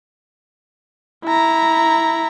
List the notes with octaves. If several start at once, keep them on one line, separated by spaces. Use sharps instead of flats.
E4 A#5